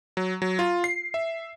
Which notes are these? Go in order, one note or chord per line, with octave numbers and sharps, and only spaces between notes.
F#3
F#3
F4
C7
E5